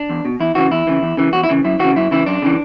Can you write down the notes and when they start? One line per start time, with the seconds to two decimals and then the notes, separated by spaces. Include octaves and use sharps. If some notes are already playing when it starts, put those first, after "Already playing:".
Already playing: D4
0.09 E2
0.25 B2
0.40 E2 E4
0.55 C#3 E3 F#4
0.71 E2 E4
0.87 C#3 E3
1.02 E2
1.17 C#3 E3
1.33 E2 F#4
1.43 E4
1.49 C#3 E3
1.64 F#2 E4
1.79 C#3 E3 F#4
1.96 F#2 E4
2.11 C#3 E3 E4
2.26 F#2 D4
2.42 C#3 E3